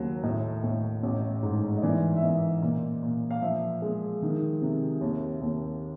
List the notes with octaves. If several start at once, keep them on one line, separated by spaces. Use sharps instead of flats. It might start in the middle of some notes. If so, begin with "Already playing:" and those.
Already playing: D#2 C#3 F#3
A2 D#5
A2
A1
G#2
D#5
E3 D5
E5
E3 D#5
A#2
A#2
F5
F3 E5
G#3
D#3
C3
D#2
D#2